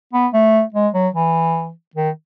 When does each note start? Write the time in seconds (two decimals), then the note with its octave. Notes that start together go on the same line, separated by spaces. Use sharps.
0.13 B3
0.33 A3
0.74 G#3
0.94 F#3
1.14 E3
1.95 D#3